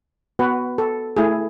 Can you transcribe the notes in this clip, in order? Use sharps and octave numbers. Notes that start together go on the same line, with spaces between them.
B3 F#4 B4
A4
A3 E4 G#4